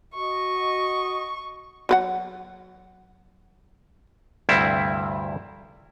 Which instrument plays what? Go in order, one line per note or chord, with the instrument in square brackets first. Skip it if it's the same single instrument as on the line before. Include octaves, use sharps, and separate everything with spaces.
[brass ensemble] F#4 D#5 [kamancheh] C#6
[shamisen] F#3 B4 F#5
[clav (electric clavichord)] D2 G2 C3 G3 C4 E4